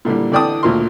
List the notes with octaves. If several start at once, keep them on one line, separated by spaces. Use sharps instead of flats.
A#2 D3 E3 G3
D3 E3 D5 G5 A5 D#6
D2 A#2 F3 A#4 C6